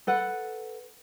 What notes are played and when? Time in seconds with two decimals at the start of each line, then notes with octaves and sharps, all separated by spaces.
0.07 A4 B4 F#5